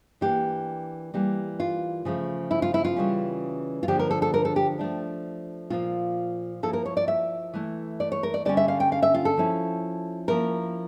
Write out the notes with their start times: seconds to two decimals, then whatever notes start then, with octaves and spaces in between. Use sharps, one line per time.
0.21 E3 A#3 D4 G4
1.14 E3 G3 A#3
1.60 F4
2.05 C#3 F3 A3
2.51 E4
2.62 F4
2.74 E4
2.84 F4
2.96 C#3 E3 G3 C#4
3.83 F4
3.88 D3 F3 A#3 D4 G4
3.99 A#4
4.11 A4
4.22 A4
4.34 A#4
4.45 A4
4.56 G4
4.79 F3 A3 D4
5.70 A#2 F3 A#3 F4
6.63 F3 A#3 E4 A4
6.73 A#4
6.86 C#5
6.97 D5
7.08 E5
7.54 E3 A3 E4
8.00 D5
8.12 C#5
8.23 A#4
8.34 D5
8.45 D3 G3 C#4 D5
8.57 E5
8.68 F5
8.80 G5
8.92 F5
9.03 E5
9.14 F4
9.25 A4
9.38 F3 C#4 E4
10.28 F3 A#3 C#4 E4 A#4